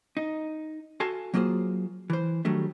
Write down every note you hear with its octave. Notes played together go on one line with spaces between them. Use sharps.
D#4
F#4 A4 F5 G#5 A5 C6
F#3 A#3 F4 G#4 C5
E3 C5
D#3 F#3 G3 A3 D4